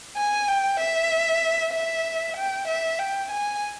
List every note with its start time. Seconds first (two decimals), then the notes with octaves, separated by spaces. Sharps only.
0.17 G#5
0.48 G5
0.79 E5
1.73 E5
2.37 G5
2.68 E5
2.99 G5
3.30 G#5